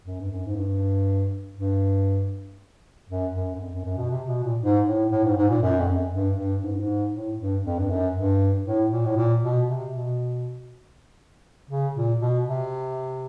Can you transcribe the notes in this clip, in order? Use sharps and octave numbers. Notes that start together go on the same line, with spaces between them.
F#2
G2
F#2
G#2
G2
G2
F#2
F#2
F#2
F2
F#2
F#2
B2
C3
B2
A#2
G#2
A2
A2
G#2
G#2
A#2
F#2
F2
F#2
G2
G2
G#2
G2
G#2
A2
G2
F2
G2
F#2
G2
A2
A#2
A2
A#2
B2
C3
B2
C#3
A#2
B2
C3